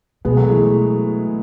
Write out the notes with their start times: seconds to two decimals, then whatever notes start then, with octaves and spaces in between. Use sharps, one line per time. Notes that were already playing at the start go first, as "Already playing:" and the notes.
0.25 B2 G#3 B3
0.37 F#3 A3
0.50 E3 G#3